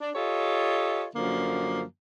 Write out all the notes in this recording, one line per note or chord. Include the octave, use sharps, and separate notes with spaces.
D4
F4 G4 A4 C#5 D#5
F#2 D3 F3 F#3 A#3